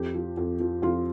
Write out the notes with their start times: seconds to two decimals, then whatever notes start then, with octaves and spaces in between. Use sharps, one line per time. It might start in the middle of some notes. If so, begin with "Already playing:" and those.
Already playing: F2 G4
0.14 F3
0.37 F2
0.60 F3
0.82 F2 F4